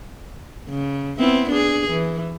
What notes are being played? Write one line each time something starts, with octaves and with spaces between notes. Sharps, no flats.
C#3
B3 C4 E4
D4 G#4
E3